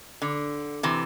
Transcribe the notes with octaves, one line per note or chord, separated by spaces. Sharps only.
D3
C3 E3